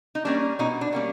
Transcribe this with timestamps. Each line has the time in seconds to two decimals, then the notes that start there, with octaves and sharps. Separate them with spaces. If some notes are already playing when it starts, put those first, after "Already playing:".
0.15 D#4
0.25 G3 A#3 C#4 D4
0.59 B2 C#4 D#4
0.81 D4
0.93 G3 A#3 C#4